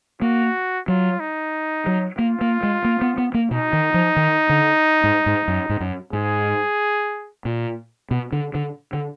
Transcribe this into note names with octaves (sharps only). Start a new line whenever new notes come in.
A#3 F#4
F#3 F4
D#4
F#3
A#3 F4
A#3
G#3
A#3
B3
B3
A#3
B2 D#4
D#3
F3
D#3
D3
G#2
G#2
F#2
G#2
F#2
G#2 G#4
A#2
B2
D3
D3
D3